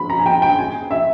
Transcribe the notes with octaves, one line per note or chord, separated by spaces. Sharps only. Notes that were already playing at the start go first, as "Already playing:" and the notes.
Already playing: B5
A#5
G#5
G5
G5
G#5
E5